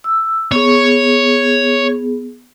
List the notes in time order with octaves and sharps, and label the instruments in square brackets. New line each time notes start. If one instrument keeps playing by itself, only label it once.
[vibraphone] E6
[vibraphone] B3 G#4 [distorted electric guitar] C#5